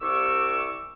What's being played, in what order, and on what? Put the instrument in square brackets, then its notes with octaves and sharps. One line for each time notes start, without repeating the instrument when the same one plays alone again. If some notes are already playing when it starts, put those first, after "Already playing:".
[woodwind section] C2 C#6 D6 E6